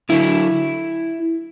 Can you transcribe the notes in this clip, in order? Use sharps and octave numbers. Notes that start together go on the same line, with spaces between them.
D3 F#3 E4